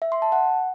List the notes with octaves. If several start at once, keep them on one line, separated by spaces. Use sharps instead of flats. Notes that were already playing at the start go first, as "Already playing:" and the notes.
E5
C6
A5
F#5